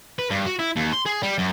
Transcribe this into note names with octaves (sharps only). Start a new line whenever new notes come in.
B4
G2
F#4
E4
D#2
C6
G#4
G3
F#2